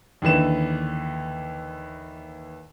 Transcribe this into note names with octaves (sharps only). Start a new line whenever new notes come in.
D#2 D3 E3 E7